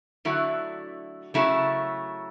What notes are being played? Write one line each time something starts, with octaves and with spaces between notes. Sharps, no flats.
D3 F#3 A3 E4
C#3 F#3 A3 E4